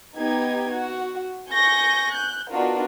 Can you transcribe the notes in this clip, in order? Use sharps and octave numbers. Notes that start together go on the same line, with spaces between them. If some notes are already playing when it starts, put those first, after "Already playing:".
B3 D#4 G4 G#6
F#4
G#5 C#6 G6 A#6
F#6 G6
B3 D4 D#4 F4 F#4 A#4